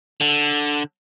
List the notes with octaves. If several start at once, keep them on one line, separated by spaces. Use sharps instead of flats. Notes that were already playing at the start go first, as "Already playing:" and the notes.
D3